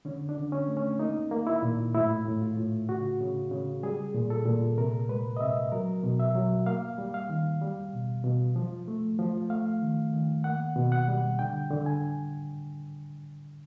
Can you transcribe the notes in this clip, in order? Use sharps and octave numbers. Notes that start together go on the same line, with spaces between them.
D3 C#4
D4
D3
C#4
A3
C#4
A#3 D#4
A#3
E4
A#2
A2 E4
A2
F4
A2
C#3 F#4
C#3
C#3
G3 G#4
A#2
A4
A#2
C3 A#4
G#3 B4
D#5
C3 E5
F#3 A#4
B2
E5
F#3
A#3 F5
G3
F5
D#3
G3
B2
B2
F3
A3
F3
A3 F5
D#3
D#3
A#3 F#5
B2
F#5
G3
D3 G5
D3
G#5